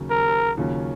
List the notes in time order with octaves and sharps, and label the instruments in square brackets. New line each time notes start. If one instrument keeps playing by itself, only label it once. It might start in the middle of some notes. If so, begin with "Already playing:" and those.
Already playing: [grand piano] D#2 C#3 F#3
[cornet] A#4
[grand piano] D#2 C#3 F#3 C#4 F4